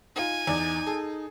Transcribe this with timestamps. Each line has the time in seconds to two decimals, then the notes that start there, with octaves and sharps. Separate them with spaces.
0.16 D#4 F4 G#5
0.47 E2 D#4 D5
0.87 G#4 A4